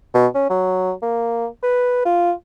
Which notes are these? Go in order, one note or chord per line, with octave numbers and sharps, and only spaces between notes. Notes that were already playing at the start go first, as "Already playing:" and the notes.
B2
C#4
F#3
A#3
B4
F4